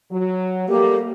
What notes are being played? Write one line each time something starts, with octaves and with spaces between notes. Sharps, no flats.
F#3
G3 A3 A#3 G4